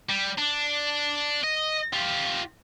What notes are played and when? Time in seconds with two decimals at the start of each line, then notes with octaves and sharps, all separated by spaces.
0.10 G3
0.38 D4
1.44 D#5
1.94 F4 G4